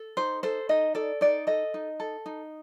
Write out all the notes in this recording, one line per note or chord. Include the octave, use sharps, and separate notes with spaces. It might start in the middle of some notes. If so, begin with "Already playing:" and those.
Already playing: A4
D#4 C5
A4 C5
D#4 D#5
A4 D5
D#4 D5
A4 D#5
D#4
A4
D#4